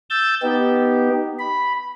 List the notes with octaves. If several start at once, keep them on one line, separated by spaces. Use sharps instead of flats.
E6 G6 A6
B3 D#4 G4
B5